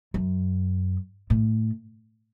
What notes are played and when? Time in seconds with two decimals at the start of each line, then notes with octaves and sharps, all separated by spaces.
0.14 F#2
1.30 A2